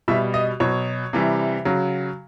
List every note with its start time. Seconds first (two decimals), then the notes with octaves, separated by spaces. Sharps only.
0.08 B2 G3 E5
0.34 D#5
0.60 B2 F#3 C#5
1.13 C3 E3 G3
1.65 C#3 F#3